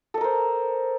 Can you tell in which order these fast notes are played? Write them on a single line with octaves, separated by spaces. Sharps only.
A4 D#5 A#4 C5